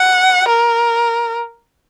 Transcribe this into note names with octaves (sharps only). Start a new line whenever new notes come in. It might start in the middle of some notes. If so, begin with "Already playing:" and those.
Already playing: F#5
A#4